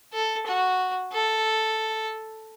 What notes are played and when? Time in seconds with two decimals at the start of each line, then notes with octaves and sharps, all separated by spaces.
0.13 A4
0.46 F#4
1.13 A4